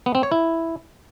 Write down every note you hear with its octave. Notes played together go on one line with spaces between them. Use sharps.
B3
C4
C#5
E4